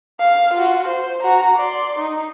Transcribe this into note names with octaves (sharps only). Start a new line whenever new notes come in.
F5
F4 F#4
C5
F#4 A#5
D5 C6
D#4